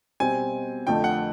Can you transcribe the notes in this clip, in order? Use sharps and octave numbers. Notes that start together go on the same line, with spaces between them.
B2 G3 C4 G#5
F2 D3 F3 A3 G5
F#5